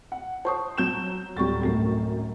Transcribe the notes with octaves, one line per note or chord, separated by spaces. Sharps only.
F#5
C5 A5 C#6 D#6
F#3 G6 E7
D2 A2 F#3 G3 C#6 A6
G#1 F#2 A2 G3 A3